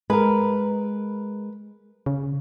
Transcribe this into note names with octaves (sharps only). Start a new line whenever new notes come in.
G#3 A#4 B4
C#3